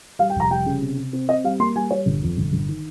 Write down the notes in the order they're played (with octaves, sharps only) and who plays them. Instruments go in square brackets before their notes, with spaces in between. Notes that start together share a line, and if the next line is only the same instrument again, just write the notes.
[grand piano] G3 F5
G5
F1 A#5
G3 G5
C#3
C3
C3
C4
C4 D#5
G3 F5
A#3 C6
G3 G#5
G3 C#5
G1
F2
G1
G1
D#3